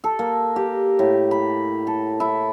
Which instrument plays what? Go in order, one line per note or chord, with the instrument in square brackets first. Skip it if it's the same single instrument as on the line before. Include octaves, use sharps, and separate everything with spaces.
[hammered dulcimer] A4
A#3
G4
A2
B5
A4
E4